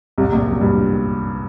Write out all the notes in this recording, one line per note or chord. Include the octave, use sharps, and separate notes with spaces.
C2 C3
A#1 A#2
F#2
G2